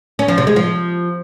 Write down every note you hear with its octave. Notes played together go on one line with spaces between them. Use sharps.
C#4
F3
C3
G#3
F3